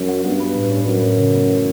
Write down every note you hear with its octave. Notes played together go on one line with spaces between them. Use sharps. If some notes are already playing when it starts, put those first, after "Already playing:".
Already playing: F#2 F#3
F#4
G2 B3
B4
A2
C#4
F#2 F#3
A2
C#3
B3
E3